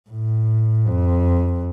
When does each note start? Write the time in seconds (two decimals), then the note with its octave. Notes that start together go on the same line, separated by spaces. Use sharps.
0.10 A2
0.88 F2